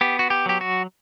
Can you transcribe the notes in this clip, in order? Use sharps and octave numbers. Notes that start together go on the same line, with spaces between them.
B3 G4
F#4
G4
F#3 G4
F#4